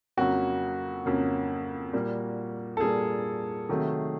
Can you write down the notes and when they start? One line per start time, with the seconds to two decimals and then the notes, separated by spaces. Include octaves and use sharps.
0.17 F2 C#3 F#3 A#3 F#4
1.06 F2 C#3 F#3 A#3
1.93 A#2 G3 A#3
2.77 A4
2.80 A#2 G3 A#3 G#4
3.69 C3 D#3 F#3 A3